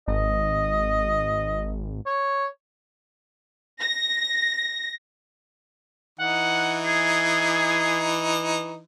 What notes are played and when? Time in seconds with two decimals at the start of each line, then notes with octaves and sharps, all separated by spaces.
0.08 G#1 D#5
2.06 C#5
3.80 A#6
6.20 E3 D#4 F#5
6.85 G#4